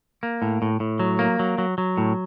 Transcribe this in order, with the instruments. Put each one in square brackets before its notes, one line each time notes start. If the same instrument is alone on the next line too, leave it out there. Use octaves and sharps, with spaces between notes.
[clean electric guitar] A#3
A2
A2
A2
F#3
A#3
F#3
F#3
F#3
A2